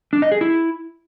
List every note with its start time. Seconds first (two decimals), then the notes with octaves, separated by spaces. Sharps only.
0.13 D4
0.22 D#5
0.32 G#4
0.41 E4